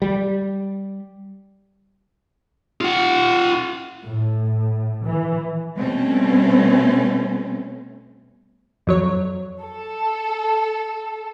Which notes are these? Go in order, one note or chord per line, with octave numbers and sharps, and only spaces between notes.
G3
F4 F#5
A2
E3
B2 G3 A3 C4 C#4
F2 F#3 C#5
A4